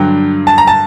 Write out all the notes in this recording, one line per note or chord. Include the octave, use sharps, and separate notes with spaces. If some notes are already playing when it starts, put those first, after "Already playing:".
Already playing: G2 D3 F#3 G5
A5
A#5
A5